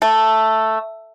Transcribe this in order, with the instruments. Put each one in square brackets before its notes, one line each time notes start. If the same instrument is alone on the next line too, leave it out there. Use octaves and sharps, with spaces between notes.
[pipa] A3